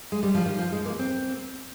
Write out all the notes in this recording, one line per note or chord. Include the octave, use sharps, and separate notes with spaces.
G#3
G3
F3
D#3
F3
G#3
A#3
C4